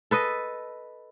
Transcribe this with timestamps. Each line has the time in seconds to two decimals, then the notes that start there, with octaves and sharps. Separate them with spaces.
0.11 A4 B4 D#5